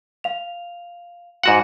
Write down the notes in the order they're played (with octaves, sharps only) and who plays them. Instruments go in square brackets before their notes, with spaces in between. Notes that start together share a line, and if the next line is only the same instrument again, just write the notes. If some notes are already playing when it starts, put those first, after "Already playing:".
[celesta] F5 F7
[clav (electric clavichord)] G#2 F#4 F#5 [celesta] F5 C6